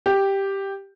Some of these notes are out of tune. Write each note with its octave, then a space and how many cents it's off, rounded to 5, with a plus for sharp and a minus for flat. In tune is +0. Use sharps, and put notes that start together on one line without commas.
G4 +0